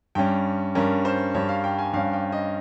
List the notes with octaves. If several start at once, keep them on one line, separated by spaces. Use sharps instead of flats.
G2 G3 C#4 G5
G2 G3 C#4 A#4
C5
G2 G3 C#4 C#5
F5
G5
G#5
G2 G3 C#4 F5
G5
D#5